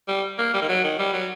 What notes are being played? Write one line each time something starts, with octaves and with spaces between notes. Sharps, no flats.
G3
A#3
G3
D#3
F#3
D#3
G3
F#3